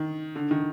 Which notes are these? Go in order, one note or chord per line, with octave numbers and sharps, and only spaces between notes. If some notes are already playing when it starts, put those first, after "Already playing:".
Already playing: D#3
D3
D#3